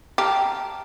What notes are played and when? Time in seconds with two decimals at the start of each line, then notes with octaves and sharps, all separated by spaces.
0.18 G4 A5 A#5 F6